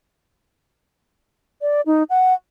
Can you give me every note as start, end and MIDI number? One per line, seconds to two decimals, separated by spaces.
1.61 1.81 74
1.86 2.03 63
2.10 2.34 78